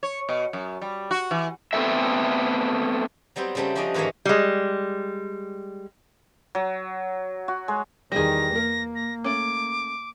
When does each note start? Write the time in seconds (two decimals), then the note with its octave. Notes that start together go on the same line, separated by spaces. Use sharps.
0.03 C#5
0.29 B2
0.53 F#2
0.81 G3
1.11 F#4
1.31 E3
1.73 A3 B3 C4 A4 A#4 E5
3.36 F#3 G3 B3 C4
3.55 C#3 F#3 G3 A3 C4
3.75 F3 G3 C#4 D4 D5 D#5
3.94 G#2 D#3 E3 A#3 C#5 D#5
4.25 G3 G#3
6.55 F#3
7.48 F#4
7.68 G#3
8.12 E2 D#3 G3 G#4 A#6
8.56 A#3 A#4
8.95 A#6
9.24 A3 C#4 D6